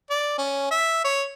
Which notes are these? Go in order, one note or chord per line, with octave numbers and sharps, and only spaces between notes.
D5
C#4
E5
C#5